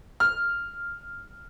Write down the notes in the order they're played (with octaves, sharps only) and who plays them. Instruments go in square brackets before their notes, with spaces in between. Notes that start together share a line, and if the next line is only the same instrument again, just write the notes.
[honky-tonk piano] F6